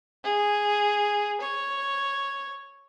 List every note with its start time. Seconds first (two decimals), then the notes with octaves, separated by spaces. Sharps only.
0.24 G#4
1.41 C#5